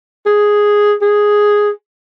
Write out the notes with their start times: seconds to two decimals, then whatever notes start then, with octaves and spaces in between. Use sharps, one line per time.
0.26 G#4
1.02 G#4